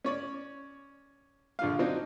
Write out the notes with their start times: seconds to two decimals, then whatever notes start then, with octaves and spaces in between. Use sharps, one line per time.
0.04 C#4 C#5 D5
1.59 A#1 D3 F4 F5
1.79 F#3 C4 D4 D#4